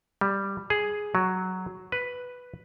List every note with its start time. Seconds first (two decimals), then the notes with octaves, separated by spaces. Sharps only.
0.21 G3
0.70 G#4
1.15 F#3
1.92 B4